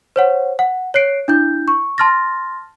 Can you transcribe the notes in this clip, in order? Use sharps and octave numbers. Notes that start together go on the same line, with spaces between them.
C5 C#5 F#5
F#5
C#5 F#6 C7 D7
D4 E4 G6
C#6
A5 C6 F6 A6 A#6